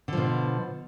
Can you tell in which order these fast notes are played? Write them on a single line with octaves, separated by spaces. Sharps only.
D3 F3 B2